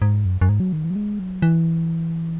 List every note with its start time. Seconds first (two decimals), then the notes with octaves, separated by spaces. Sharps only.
0.02 G#2
0.25 F#2
0.41 F#2
0.49 G#2
0.60 F#3
0.73 D#3
0.85 E3
0.90 F#3
0.96 G#3
1.19 F#3
1.42 E3